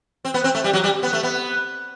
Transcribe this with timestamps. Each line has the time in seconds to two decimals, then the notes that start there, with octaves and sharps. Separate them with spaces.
0.25 C4
0.34 B3
0.44 C4
0.55 A3
0.64 G3
0.73 F#3
0.84 G3
1.03 B3
1.13 A3
1.23 B3